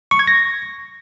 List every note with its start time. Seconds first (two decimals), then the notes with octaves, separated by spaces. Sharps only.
0.11 C#6
0.19 G#6
0.27 A#6